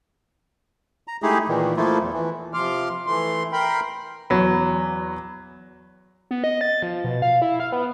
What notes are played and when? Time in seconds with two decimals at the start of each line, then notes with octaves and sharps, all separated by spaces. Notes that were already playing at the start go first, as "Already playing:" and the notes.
1.08 A#5
1.22 G#3 A3 D#4 E4 G4 G#4
1.48 A#2 D#3 E3
1.76 F3 A3 A#3 E4 F4
2.02 E2
2.13 E3
2.54 C3 F3 C6 D6 F6
3.07 E3 A3 C6
3.53 A#4 G5 B5 C6
4.30 E2 F#3 B5
6.31 B3
6.44 D#5
6.61 A6
6.82 F3
7.04 B2
7.22 F5
7.42 E4
7.60 F5
7.72 B3